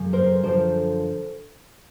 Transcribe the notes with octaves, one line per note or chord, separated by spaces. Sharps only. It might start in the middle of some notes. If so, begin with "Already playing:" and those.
Already playing: F#2 C#3 F#3
A#4 C5
F#2 D3 F3 A#4 C5